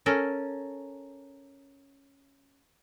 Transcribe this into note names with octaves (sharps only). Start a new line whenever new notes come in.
C#4 A4 A#4